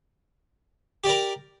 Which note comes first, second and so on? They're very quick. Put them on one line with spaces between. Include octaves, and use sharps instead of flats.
G4 D5 A#4